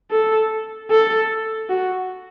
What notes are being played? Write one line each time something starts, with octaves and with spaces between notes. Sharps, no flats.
A4
A4
F#4